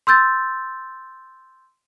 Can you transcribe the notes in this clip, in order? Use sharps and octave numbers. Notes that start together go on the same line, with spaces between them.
C6 E6 G6 A6